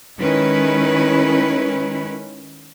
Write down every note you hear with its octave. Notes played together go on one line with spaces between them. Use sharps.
D#3 G#3 C#4 E4 B4